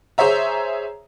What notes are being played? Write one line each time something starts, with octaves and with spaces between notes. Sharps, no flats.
G#4 C5 C#5 E5 A#5